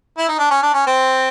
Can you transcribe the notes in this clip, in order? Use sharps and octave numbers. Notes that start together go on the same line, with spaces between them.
E4
D#4
D4
C#4
D4
C#4
C4